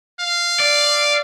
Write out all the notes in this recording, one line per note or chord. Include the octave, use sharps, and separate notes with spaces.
F5
D5